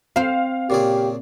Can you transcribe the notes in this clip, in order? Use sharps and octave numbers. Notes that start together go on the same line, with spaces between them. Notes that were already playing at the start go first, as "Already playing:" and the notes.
C4 C5 F5
A#2 C#3 G4 G#4